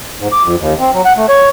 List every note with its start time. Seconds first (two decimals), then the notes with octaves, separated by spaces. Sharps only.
0.20 G#2
0.32 D6
0.44 F2
0.60 D#2
0.80 C4
0.94 F#3
1.05 F#5
1.17 A3
1.29 C#5